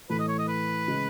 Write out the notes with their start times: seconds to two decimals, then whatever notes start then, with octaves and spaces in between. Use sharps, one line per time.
0.10 A2 E3 A3 B4
0.19 D#5
0.28 C#5
0.38 D#5
0.48 B4
0.88 C#3 G#3